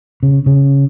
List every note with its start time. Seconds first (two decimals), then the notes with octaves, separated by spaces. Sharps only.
0.23 C#3
0.46 C#3